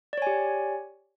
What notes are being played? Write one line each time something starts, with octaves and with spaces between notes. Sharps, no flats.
G4 C#5 D5 G#5